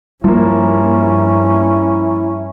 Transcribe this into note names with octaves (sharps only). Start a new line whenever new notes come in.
G2 F3 G3 A#3 C#4 E4